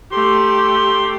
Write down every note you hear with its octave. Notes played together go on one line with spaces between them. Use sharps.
A3 G4 C6